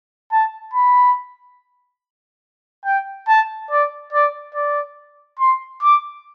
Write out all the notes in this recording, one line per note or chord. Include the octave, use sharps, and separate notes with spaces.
A5
B5
G5
A5
D5
D5
D5
C6
D6